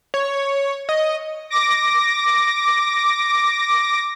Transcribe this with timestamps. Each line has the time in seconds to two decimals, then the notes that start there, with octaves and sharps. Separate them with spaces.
0.14 C#5
0.89 D#5
1.50 D6 A#6